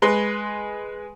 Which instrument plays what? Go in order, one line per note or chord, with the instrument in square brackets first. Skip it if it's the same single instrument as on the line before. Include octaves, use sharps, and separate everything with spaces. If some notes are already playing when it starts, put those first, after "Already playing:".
[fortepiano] G#3 B4 C6